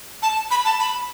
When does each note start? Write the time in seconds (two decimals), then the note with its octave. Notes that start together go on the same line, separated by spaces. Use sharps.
0.22 A5
0.51 B5
0.65 A5
0.79 B5